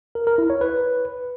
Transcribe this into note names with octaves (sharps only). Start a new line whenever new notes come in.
A#4
A#4
E4
C#5
B4